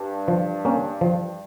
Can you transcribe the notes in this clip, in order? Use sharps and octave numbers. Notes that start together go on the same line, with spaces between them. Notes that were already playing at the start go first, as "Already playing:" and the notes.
Already playing: G2
F3
A#3 C#4
F3